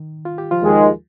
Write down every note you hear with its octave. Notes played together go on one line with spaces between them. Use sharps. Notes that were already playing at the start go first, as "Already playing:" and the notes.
Already playing: D#3
F4
G4
F3 F4
D#2 D#3 G#3